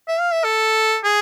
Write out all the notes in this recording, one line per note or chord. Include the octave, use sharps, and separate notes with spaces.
E5
F5
E5
A4
G#4